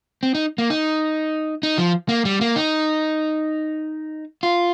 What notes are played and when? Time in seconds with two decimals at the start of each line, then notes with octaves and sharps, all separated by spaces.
0.23 C4
0.35 D#4
0.58 A#3
0.70 D#4
1.63 D#4
1.78 F3
2.09 A#3
2.25 G3
2.41 A#3
2.56 D#4
4.43 F4